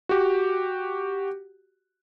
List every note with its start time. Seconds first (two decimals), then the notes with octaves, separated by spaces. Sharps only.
0.09 F#4 G4